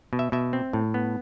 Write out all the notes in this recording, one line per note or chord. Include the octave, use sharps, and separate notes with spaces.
B2
E5
B2 E5
C4
A2
B3